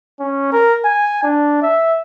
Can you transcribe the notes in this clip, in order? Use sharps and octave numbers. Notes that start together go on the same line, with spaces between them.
C#4
A#4
G#5
D4
E5